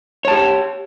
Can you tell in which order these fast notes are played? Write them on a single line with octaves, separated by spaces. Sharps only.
C#5 A5 G4